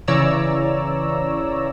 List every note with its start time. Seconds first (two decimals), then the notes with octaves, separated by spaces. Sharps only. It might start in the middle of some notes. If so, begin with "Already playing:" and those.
0.08 C#3 E3 C#5 D5 A#5 E6